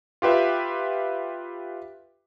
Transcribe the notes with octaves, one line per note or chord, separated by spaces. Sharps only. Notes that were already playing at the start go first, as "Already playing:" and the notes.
F4 G4 B4 E5